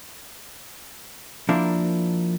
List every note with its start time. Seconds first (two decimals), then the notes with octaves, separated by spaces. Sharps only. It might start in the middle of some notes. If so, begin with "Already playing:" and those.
1.49 F3 A#3 D4 E4 A#4